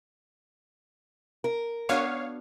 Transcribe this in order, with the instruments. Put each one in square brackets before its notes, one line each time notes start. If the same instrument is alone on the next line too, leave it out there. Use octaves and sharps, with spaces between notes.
[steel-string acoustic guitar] A#4
[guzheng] B3 D4 F#4 [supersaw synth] C#5 F5